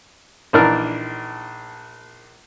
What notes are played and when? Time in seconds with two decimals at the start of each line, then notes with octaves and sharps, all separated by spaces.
0.53 A#1 E3 D4 D#4 A#4 F6